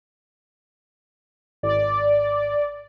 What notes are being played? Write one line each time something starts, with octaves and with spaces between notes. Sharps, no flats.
G#1 D5